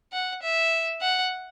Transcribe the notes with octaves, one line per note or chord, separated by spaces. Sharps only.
F#5
E5
F#5